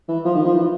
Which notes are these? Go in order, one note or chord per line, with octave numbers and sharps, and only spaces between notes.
E3
F3
D#3
F3
E3